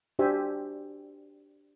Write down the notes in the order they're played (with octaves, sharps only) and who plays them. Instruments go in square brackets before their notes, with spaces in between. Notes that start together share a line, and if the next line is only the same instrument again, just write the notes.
[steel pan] D4 F#4 G4 C5 E5 G#5